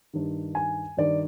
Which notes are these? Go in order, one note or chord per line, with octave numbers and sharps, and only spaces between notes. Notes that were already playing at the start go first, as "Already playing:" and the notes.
G2 D#3
G#5
G2 D#3 D5